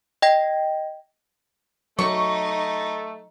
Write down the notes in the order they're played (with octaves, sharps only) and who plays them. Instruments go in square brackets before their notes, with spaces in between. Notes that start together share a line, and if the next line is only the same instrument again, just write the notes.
[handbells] D#5 G5 A#6
[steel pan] F#3 [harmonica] A3 [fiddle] D#4 [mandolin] C#6